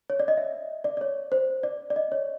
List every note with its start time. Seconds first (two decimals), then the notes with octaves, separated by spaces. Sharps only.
0.10 C#5
0.20 D5
0.28 D#5
0.37 E5
0.84 D5
0.97 D5
1.01 C#5
1.32 C5
1.63 D5
1.90 D5
1.96 D#5
2.12 C#5